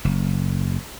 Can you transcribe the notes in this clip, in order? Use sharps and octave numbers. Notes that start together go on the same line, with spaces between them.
F#1